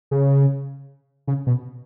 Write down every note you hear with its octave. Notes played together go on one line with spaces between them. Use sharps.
C#3
C#3
B2